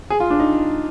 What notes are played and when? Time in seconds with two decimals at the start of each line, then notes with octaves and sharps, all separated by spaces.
0.10 G#4
0.20 F4
0.30 D4
0.40 D#4